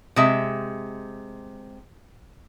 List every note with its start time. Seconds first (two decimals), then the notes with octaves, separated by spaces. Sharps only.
0.16 C3 G#3 E5